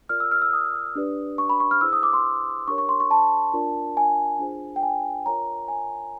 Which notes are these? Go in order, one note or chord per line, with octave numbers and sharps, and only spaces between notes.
F4 A#4 D5 F6
E6
F6
E6
D#6
D4 G4 B4 D5
C#6
B5
C#6
F6
E4 G#4 C5 E6
D#6
D6
C6
D4 G4 A#4 C#5 C#6
C#6
C6
C#6
A5
D4 F4 A#4 D5
G#5
D4 F4 G#4 C5
G5
G#5
F4 A#4 C#5 A#5
G#5